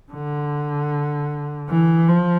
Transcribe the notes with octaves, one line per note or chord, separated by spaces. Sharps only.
D3
E3
F3